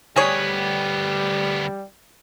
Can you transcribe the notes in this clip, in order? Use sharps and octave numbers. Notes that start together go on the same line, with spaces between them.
D2 G3 B3 G#4 C#5